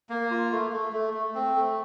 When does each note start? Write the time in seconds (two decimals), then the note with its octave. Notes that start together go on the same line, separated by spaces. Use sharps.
0.09 A#3
0.31 F4
0.52 A3
0.72 A3
0.93 A3
1.13 A3
1.35 C4
1.56 A3